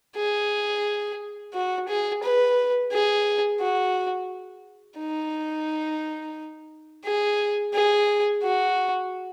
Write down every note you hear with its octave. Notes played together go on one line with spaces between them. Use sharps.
G#4
F#4
G#4
B4
G#4
F#4
D#4
G#4
G#4
F#4